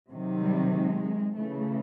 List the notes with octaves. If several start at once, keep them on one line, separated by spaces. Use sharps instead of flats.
C3 D#3 F#3
G3
G#3
C#3 E3 A3